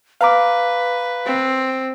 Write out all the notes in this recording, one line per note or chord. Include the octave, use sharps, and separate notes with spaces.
B4 F5 A#5 D6
C4